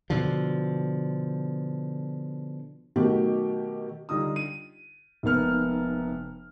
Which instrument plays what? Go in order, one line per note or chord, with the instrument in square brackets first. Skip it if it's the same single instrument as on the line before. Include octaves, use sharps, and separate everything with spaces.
[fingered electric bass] B2 D3 F3
[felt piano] B2 D#3 F#3 A3 G4
[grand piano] D3 G3 D#4 F4 D#6
D#7
F1 G#2 A#3 B3 F6